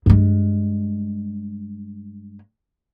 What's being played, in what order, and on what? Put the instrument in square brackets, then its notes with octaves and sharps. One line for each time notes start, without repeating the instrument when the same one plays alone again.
[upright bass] G2 G#3